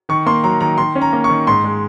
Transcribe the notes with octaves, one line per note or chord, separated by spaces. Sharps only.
D#3 C#6
A#3 C6
F#3 A#5
D#3 A#5
D#3 C6
C#4
A#5
A#3
C#6
D#3
G#2 C6
G#3